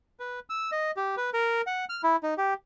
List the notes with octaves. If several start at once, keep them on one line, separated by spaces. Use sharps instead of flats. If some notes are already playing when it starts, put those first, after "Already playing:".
B4
E6
D#5
G4
B4
A#4
F#5
F6
E4
D#4
G4